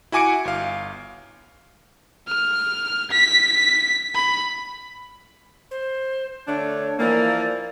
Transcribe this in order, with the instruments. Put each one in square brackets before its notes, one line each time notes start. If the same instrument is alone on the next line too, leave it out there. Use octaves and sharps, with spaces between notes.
[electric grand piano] E4 F#4 G#5 D6 C#7 D7
G1 F5
[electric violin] F6
B6
B5
[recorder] C5
[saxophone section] D3 A3 D4 [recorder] C#5
[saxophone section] E3 F3 A#3 [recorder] D5